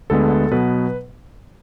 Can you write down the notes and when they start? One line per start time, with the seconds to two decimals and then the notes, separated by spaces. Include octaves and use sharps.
0.10 D2 D3 G#3 B3 A4
0.51 B2 F#3 B3 B4